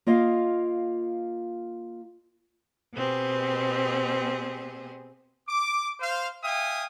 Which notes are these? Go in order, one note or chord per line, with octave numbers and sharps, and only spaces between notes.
A#3 F4 D#5 F5
B2 B3 C4 G4 G#4
D6
C5 F5
E5 F5 G5 G#5 D#6